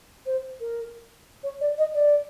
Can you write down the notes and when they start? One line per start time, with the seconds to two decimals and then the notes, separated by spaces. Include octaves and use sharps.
0.26 C5
0.60 A#4
1.43 C#5
1.61 D5
1.78 D#5
1.94 D5